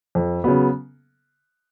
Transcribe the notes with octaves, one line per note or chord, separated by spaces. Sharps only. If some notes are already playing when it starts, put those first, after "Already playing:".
F2
C#3 F#3 B3